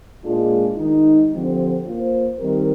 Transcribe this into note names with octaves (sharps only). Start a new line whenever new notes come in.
A#2 G#3 D4 F4 G#4
D#3 G#3 D#4
D3 F3 C4 G4
A#3 F4 C5
D#3 G3 C4 G4 A#4